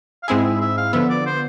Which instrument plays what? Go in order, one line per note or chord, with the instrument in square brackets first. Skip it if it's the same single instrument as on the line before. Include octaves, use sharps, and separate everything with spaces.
[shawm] F5
[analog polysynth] G#2 G#3 C4 E4 G#4 [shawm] E5
[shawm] E5
E5
F5
[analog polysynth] D3 F3 B3 [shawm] E5
[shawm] D5
C5